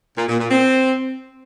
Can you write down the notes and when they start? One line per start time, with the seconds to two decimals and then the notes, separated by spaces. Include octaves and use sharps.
0.18 A#2
0.29 A#2
0.40 A#2
0.51 C4